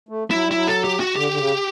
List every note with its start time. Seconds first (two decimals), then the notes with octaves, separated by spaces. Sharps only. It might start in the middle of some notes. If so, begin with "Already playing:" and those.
0.09 A3
0.30 F#3 E4
0.43 G3
0.51 F#3 E4
0.68 A4
0.84 G4
1.00 F#4
1.16 D3 G4
1.31 D3
1.37 C#3